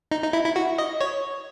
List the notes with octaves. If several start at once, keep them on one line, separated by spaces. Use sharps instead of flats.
D#4
D#4
E4
E4
F#4
D#5
C#5